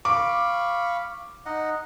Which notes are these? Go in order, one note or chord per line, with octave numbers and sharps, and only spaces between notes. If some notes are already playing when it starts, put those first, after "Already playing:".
F5 B5 C#6 D6
D#4 D#5 F#5